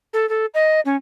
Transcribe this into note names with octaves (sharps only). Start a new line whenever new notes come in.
A4
A4
D#5
C#4